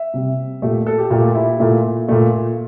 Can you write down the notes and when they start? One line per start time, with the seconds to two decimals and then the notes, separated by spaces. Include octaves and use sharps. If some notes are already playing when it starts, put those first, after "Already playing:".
Already playing: E5
0.14 C3 G3
0.62 A#2 A3 G4
0.87 A4
0.98 G4
1.10 A#2 A3 G4
1.35 E4
1.59 A#2 A3
2.08 A#2 A3